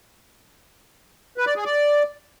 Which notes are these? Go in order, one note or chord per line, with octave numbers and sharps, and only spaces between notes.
B4
D5
G#4
D5